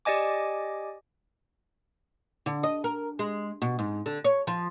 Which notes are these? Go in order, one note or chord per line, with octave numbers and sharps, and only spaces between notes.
G4 D5 D#5 G#5 D6
D3
D#5
A#4
G#3
B2
G#2
D3
C#5
F3